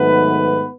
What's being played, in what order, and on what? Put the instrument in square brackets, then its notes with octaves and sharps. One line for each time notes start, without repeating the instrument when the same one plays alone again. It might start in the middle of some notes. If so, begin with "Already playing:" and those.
Already playing: [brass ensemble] G#2 D#3 F#3 A3 B3 B4